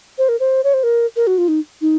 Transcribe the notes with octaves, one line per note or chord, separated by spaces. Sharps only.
C5
A#4
C5
C#5
C5
A#4
A#4
F#4
F4
D#4
D#4